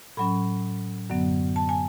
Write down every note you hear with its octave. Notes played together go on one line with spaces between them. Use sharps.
A2 F#3 C#4 B5
F#2 D3 F#3 B3
A5
G#5